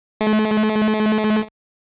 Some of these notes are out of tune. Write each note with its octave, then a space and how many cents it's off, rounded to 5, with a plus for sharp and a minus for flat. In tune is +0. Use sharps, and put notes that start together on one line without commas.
A3 -40